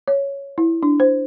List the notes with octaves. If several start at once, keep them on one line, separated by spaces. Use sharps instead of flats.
C#5
E4
D4
C5